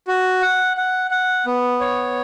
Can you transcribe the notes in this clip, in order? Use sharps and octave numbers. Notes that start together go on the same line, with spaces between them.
F#4
F#5
F#5
F#5
B3
C#5